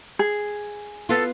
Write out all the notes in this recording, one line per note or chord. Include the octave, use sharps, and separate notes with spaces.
G#4
B3 F4 A4